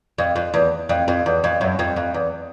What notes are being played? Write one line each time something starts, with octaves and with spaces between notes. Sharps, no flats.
F2
F2
E2
F2
F2
E2
F2
F#2
F2
F2
E2